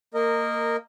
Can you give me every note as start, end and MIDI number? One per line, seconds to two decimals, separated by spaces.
0.14 0.76 58
0.14 0.76 70
0.14 0.76 75